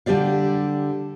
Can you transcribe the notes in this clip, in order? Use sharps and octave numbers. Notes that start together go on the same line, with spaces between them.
D3 G3 G4 D5 F5